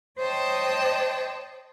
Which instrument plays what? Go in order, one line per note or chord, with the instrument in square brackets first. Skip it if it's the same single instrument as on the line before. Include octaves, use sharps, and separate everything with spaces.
[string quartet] C5 C#5 D#5 G5 A5